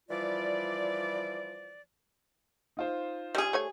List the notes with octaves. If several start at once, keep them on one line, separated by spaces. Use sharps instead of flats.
E3 F3 G3 F4 D5
D#4 F4 C5
G3 G#4
A3 C#5 G#5